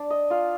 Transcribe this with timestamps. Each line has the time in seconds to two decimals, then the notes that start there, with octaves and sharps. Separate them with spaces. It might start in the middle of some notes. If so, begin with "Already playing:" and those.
Already playing: D4
0.10 D#5
0.30 F4 F5